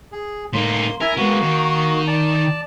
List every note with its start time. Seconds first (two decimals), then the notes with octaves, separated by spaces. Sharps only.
0.12 G#4
0.53 A2 A#3 D#4 C6
1.01 E4 A#4 E5 G#5
1.17 G#3 A#3 B3 F#4
1.41 D#3
2.07 D5 A5